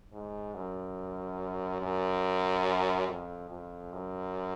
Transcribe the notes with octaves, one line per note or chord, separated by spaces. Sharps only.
G#2
F#2
F#2
F2
F2
F#2